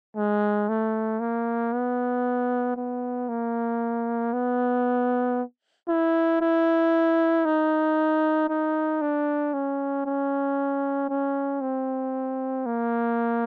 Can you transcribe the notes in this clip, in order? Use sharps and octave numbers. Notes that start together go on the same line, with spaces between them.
G#3
A3
A#3
B3
B3
A#3
B3
E4
E4
D#4
D#4
D4
C#4
C#4
C#4
C4
A#3